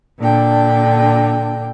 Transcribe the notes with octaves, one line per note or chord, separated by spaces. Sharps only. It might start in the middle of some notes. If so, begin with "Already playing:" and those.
A#2 D3 D4 G5